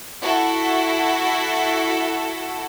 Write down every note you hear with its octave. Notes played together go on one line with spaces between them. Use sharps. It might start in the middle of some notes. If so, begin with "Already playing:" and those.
E4 F#4 A4